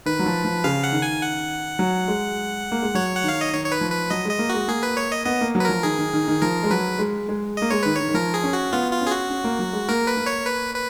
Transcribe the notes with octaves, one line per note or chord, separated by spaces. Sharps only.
D#3 B4
F#3
F3
F3
C#3 F5
F#5
D#3
G#5
F#5
F#3
G#3
A#3
G#3
F#3 C#5
F#5
D#3 F5
D#5
D#3 C#5
C#5
B4
F3
B4
F#3 D#5
G#3 D#5
A#3
G#3 F#4
A#3 G#4
B4
C#5
D#5
B3 D#5
A#3
F#3
B4
F3 A#4
D#3 G#4
D#3
D#3
D#3
F3 A#4
G#3
F#3 B4
G#3
G#3
A#3 D#5
G#3 C#5
D#3 B4
D#3 C#5
D#3
F3 A#4
G#4
C#4
F#4
B3 F4
F4
C#4
G#4
F#4
C#4
A#3
F#3
G#3
A#3 A#4
B4
A#3
C#5
B4
B4